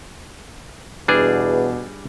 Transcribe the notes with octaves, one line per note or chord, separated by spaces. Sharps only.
E2 B2 G3 D4 G#4